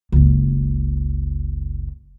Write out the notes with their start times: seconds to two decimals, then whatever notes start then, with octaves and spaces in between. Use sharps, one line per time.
0.12 F#1 C#2